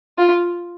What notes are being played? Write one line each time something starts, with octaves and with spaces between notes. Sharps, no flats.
F4